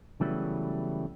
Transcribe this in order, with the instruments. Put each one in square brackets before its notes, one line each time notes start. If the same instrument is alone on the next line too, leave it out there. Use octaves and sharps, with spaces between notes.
[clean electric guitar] C#3 E3 F#3 G3 A3 B3